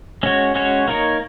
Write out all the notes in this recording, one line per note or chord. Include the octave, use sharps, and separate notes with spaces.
G#3 C#4 F#4 C#5
G#3 C#4 F#4 C#5
A#3 D#4 A#4 C#5